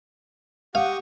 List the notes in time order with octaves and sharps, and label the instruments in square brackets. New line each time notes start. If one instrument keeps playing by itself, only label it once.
[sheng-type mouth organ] G4 C#6 D#6 [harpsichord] F5 [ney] F#5